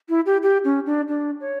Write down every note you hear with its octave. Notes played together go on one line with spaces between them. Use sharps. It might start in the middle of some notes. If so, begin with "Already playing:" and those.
E4
G4
G4
C#4
D4
D4
C#5